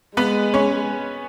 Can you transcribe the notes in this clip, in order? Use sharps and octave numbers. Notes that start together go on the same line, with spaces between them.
G#3 B3 B4
C#4 C#5